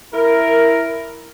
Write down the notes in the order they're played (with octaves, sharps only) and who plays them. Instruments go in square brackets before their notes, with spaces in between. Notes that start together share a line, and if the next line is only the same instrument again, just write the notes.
[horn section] E4 A#4